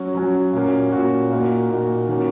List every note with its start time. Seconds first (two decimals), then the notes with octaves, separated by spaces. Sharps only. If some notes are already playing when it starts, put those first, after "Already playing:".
Already playing: F#3 C#4 F#4
0.15 F#3 C#4 F#4
0.53 A#2 A#3 C#4 F#4
0.92 A#2 A#3 C#4 F#4
1.31 A#2 A#3 D#4 F#4
1.69 A#2 A#3 D#4 F#4
2.08 D#3 A#3 C#4 F#4